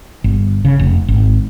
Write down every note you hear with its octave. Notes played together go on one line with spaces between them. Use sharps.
G1
C#3
F1
G#1